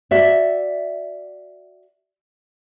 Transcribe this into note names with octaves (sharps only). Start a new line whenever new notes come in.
F#4 D5 E5